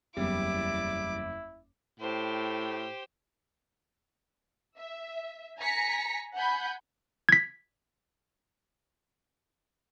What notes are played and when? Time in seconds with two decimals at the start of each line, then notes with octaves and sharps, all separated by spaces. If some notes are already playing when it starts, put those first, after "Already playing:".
0.17 F#1 E2 G3 E4 D6
2.00 A2 G4 C5
4.77 E5
5.58 G#5 A#5 A#6 B6 C#7
6.36 F#5 G#5 B5 G6
7.29 G#6 B6